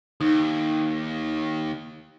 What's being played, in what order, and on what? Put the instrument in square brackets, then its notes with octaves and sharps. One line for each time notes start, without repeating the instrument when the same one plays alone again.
[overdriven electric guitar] D#2 [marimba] D#4